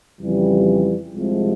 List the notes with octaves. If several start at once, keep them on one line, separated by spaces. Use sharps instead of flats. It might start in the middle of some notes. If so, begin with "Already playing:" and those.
F2 C#3 E3 G3
C2 C3 F3 G#3